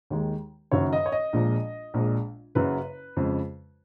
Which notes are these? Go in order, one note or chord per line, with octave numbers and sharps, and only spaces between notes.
D#2 D#3 G#3
F#1 F#2 D#3 C#5
D#5
C#5
D#5
A#1 A#2 F3 G#3
A#1 A#2 G#3
F#1 F#2 C#3 F#3 B4
F2 C#3 G#3